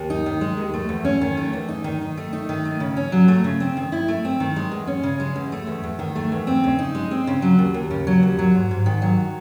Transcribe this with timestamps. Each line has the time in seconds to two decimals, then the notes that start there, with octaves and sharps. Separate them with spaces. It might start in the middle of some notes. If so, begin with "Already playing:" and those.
Already playing: D#2
0.10 D#4
0.26 D#3
0.41 G#3
0.58 D#2
0.74 A3
0.89 E2
1.05 C#4
1.21 D#3
1.37 A3
1.53 E2
1.69 D#4
1.84 D#3
2.01 D#3
2.17 A3
2.33 D#4
2.49 D#3
2.65 A3
2.80 C#3
2.97 C#4
3.12 F#3
3.28 A3
3.44 C#3
3.60 C4
3.77 D#3
3.92 E4
4.08 A3
4.25 C4
4.40 D#3
4.56 G#3
4.72 E2
4.87 C#4
5.03 C#3
5.20 G#3
5.36 E2
5.52 A3
5.67 E2
5.84 E2
5.99 D#3
6.15 A3
6.32 E2
6.47 C4
6.64 C#3
6.79 D#4
6.95 G#3
7.11 C4
7.27 C#3
7.42 F#3
7.59 D#2
7.74 D#2
7.90 C#3
8.07 F#3
8.23 D#2
8.39 F#3
8.55 G#2
8.71 G#2
8.86 D#3
9.02 F#3